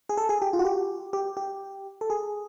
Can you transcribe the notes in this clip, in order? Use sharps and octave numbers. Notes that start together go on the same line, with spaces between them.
G#4
A4
G#4
G4
F4
F#4
G4
G4
G4
A4
G#4